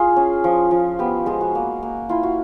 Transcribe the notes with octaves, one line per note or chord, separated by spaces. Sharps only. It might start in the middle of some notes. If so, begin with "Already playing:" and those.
Already playing: F4 G#4
C#4
F3
F3
B3 G4
G#3 F4
F#4
A#3
A#3
E4 F4
F#4